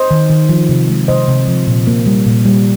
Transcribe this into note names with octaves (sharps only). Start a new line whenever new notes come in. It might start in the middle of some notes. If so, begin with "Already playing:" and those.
Already playing: C5 D#5
D#3
D#3
F3
C3
G#3
C3 C5 D#5
C3
F3
A#2
A#3
G3
A#2
G3